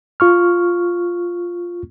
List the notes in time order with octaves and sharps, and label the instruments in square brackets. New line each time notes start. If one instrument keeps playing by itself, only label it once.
[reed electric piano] F4 C#6 F6